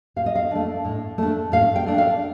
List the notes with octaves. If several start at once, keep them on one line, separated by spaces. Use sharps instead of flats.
A2 F5
D#5
F5
A3 D4
A2
A3 D4
A2 F5
G5
A3 D4
F5